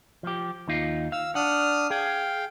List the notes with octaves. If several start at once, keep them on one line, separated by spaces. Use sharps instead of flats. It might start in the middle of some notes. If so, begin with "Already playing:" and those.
F3 G4
D#2 D#4 F4
F5 E6
D4 F#5 D#6 F6
G#4 F5 G5